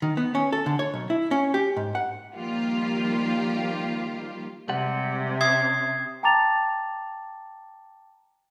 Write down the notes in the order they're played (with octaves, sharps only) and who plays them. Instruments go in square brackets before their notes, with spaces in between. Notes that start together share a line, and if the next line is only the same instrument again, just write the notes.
[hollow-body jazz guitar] D#3
B3
C#4
A4
D3
C#5
B1
E4
C#4
G4
G#2
F#5
[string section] D#3 F3 G3 A#3 F4 G4
[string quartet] C3 [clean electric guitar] G3 G#3 F#5
[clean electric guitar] C#4 E5 [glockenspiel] D#6 G#6 C7
[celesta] G5 A5 A#5 D6 A6 F7